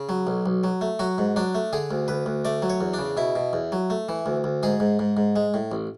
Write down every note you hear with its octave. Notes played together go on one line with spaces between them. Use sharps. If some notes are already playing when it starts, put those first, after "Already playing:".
Already playing: C#3
F#3
B1
B1
F#3
A3
F#3 F#4
G#2
F#3 D4
A3
D3 G#4
D2
D2 B4
D2
A3 D5
F#3
C#5
E2
D4
C#3
B2 E4
B2
E2
F#3
A3
E3
D2
D2
G#2 G#4
G#2
G#2
G#2
G#3
A2
A1